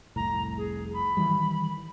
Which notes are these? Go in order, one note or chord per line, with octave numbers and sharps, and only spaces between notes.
F1 C2 A2 A#5
G#4
B5
D#3 E3 G3